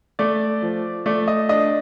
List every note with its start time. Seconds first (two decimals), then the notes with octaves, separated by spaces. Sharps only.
0.19 A3 D5
0.62 F3
1.06 A3 D5
1.28 D#5
1.49 D4 D#5